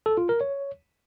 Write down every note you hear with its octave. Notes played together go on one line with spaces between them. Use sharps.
A4
F4
A#4
C#5